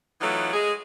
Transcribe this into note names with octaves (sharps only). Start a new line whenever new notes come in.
E3 F#3 A3 B3 D#4 F4
G#3 G#4